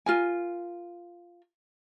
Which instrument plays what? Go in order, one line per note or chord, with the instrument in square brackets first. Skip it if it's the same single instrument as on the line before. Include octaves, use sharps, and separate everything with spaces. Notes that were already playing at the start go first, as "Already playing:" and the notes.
[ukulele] F4 A#4 G#5